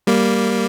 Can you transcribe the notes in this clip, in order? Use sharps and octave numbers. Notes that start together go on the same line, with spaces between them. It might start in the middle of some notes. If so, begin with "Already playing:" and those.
G3 A#3